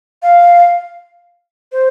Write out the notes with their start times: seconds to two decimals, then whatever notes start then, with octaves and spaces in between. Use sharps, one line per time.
0.23 F5
1.72 C5